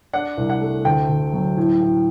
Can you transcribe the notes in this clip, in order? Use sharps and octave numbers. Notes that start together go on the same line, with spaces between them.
D4 F#5
C2
F#5
A3
D2 G5
D2
F#3
A2
A2